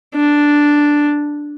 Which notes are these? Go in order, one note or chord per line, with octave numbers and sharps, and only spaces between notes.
D4